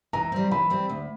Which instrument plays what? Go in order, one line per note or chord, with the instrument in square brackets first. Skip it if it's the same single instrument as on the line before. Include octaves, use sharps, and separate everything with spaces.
[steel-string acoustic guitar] E3 [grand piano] A#5
[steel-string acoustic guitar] G3 C4
[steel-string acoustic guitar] E3 [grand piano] B5
[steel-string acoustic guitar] G3 C4
D2